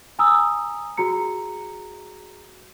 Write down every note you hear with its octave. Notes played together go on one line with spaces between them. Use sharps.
G#5 A#5 D#6 E6
F#4 G#4 A#5 C#7